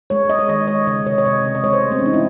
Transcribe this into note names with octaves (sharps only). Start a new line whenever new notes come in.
G#3 C#5
G#3 D#5
C#5
D#3 D#5
G#3 C#5
C#3 D#5
C3 C#5
C#5
C3 D#5
C#3 D#5
D#5
G#3 C#5
C5
A3
C4
C#4
E3 D#4
E4